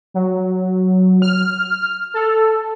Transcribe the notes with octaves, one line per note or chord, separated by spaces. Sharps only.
F#3
F6
A4